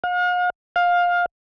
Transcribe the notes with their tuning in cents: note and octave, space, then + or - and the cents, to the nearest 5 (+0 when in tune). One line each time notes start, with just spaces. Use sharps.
F5 +45
F5 +15